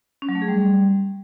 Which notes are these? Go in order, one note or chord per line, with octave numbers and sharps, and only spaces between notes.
C#4
F#3
A3
G#4
G3